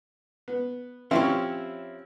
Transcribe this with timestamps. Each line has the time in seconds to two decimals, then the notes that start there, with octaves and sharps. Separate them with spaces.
0.48 B3
1.11 F3 C4 C#4 E4 G4 C#5